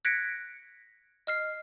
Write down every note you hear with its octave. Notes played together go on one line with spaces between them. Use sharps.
F#6 G#6 A#6 B6 C#7 D7
D#5 F6 C7